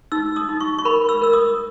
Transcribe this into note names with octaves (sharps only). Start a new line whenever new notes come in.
D#4 E6
D#6
D#4
C#6
C#6
A#4 B5
E6
A#4 E6
D#6